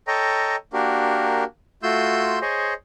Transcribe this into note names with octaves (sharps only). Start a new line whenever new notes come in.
A4 C#5 D#5 G5 A#5
A#3 D4 F#4 G4 A#4
A3 F4 F#4 C6 E6 G6
G#4 C5 C#5 D#5